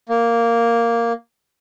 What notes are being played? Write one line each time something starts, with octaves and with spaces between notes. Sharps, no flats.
A#3